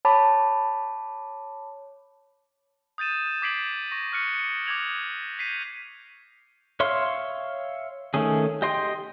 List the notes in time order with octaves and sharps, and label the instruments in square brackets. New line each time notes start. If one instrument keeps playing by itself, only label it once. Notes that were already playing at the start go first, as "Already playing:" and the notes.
[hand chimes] C#5 A5 B5 D6
[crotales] D#6 G6 A6 D#7 E7
D6 G#6 B6 C7 D7 F#7
C#6 A#6
C#6 F6 F#6 C#7 D#7
D6 D#6 G#6 F7 F#7
G6 B6 C7 D#7
[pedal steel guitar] C#5 E5 F5 C6
D#3 A3 C#4 G#4
G4 D#5 G5 C6